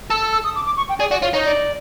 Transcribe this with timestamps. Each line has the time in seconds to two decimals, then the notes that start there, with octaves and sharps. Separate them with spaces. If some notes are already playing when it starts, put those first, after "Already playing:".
0.10 A4 E6
0.21 E6
0.32 E6
0.44 D#6
0.56 D6
0.66 D6
0.77 C#6
0.89 G5
1.00 G#4 D5
1.11 F#4 D5
1.22 F4 C#5
1.33 D#4 C#5
1.45 D5